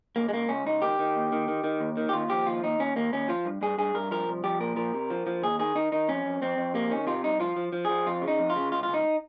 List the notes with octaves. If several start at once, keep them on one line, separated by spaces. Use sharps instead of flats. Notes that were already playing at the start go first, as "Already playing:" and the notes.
C#2 A#3
G#3
C#2 A#3
C#2 C#4
C#2 D#4
D#3 G4
D#3
D#2
D#3
D#3
D#3
D#2
D#3
G4
D#2 F4
F3 G4
D#2 F4
D#2 D#4
D#2 C#4
D#2 A#3
D#2 C#4
F3 F4
G2
G2 G#4
G2 G#4
G2 A#4
F3 A#4
C2
F3 G4
A#2 A#4
F3 A#4
C3
F3
F3
D#2 G#4
D#3 G#4
D#3 D#4
D#3 D#4
F2 C#4
F2
F2 C4
F2
C3 A#3
D#3 C#4
C3 F4
C2 D#4
F3 F4
F3
F3
F3 G#4
F2 F4
C#3
D#4
F2
F4
C#3
C#2 F4
C#2 F4
D#4